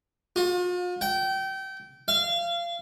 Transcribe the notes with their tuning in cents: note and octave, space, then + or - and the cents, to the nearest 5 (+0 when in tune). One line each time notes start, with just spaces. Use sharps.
F4 +40
G5 -25
F5 -25